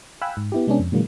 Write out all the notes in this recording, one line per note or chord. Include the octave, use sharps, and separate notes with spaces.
F5 G5 G#5 B5 E6 F#6
G#2
B3 E4 G4
C3 G#3 B3 C#4 D4 G#4
F2
A#2 D3 E3 F#3 G#3 A#3